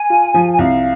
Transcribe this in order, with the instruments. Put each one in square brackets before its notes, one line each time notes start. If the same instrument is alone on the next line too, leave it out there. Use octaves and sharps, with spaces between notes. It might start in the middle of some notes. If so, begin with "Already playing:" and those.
Already playing: [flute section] G#5
[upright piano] F4
F3
[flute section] G#5
[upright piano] C2 [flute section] F5